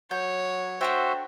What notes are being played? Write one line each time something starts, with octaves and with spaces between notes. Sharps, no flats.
F#3 C#5 G6
A3 D4 F#4 C5 E5 G5